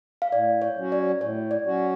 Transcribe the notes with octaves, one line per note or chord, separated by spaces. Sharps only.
F5
A2 D5
C#5
F#3 C#4 F#4
D5
A2 C#5
D5
F#3 C#4 F#4